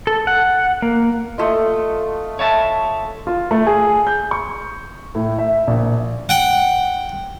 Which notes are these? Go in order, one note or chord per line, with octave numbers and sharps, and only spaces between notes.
A4
F#5
A#3
A3 F4 D#5
C#5 E5 A5
F4
A3
G#4
G6
C#6
A2
E5
A#1
F#5 G5